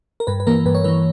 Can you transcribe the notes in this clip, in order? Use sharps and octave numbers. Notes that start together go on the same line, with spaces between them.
A#4
G2 B4
B4
E3 A#3 A#4
G2 B4
C#5
E3 A#3 B4